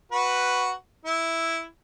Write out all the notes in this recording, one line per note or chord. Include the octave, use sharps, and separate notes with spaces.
F#4 B4
E4